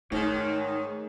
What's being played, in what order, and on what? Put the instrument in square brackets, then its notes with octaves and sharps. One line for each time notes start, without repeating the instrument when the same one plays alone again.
[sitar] G#2 [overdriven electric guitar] D#3 [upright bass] A3 [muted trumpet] C#5